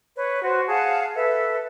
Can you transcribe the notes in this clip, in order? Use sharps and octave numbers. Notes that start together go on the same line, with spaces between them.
B4 C#5
F#4 C5
G#4 F5 F#5 A5
A4 B4 E5